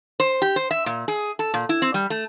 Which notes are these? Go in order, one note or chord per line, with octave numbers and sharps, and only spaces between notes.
C5
G4
C5
E5
A#2
G#4
A4
A#2
E4
C4
G3
A3